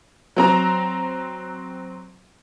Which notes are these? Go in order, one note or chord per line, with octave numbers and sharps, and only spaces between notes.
F#3 C4 A#5